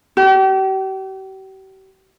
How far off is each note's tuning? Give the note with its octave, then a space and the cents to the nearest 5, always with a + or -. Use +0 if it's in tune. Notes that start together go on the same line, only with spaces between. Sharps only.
G4 -40